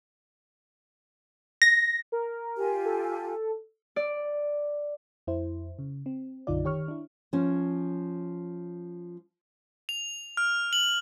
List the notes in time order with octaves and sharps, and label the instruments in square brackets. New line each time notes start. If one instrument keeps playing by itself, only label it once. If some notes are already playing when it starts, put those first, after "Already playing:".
[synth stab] A#6
[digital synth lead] A#4
[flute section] F4 G4 G#5
[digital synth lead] A4
[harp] D5
[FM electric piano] F2 E4 C5
C#3
C4
B1 F#2 D3 D#4 F4 D5
D#3 G4 C#5 C#6 F6
D4 E4
[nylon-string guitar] F3 C#4
[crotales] F7
F6
F#7